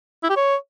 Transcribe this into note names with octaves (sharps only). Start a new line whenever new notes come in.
E4
G4
C#5